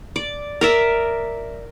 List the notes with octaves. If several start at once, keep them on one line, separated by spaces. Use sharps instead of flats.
D5
A#4 D5 E5